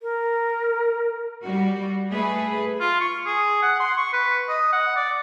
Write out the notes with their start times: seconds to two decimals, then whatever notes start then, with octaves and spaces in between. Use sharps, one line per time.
0.01 A#4
1.43 G3 F#4
2.10 A3 G#4 B4
2.81 F4
3.01 C#6
3.26 G#4
3.63 F#5
3.80 C6
3.98 C#6
4.13 B4
4.49 D#5
4.73 F#5
4.96 D5